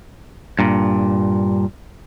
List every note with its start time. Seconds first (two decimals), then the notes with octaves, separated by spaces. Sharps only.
0.59 G2 A#2